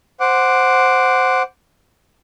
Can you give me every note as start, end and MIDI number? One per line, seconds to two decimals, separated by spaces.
0.20 1.42 72
0.20 1.42 78
0.20 1.42 86